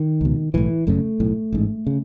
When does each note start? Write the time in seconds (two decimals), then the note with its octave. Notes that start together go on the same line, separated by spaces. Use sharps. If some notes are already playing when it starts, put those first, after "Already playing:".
Already playing: D#3
0.21 C#2 B2
0.54 B1 A2 E3
0.87 F#1 F#2 C#3 A3
1.20 B1 A2
1.53 A1 G#2
1.87 C#3